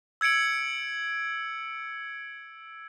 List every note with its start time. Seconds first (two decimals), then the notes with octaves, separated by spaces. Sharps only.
0.21 E6 G#6 C#7 D7 F#7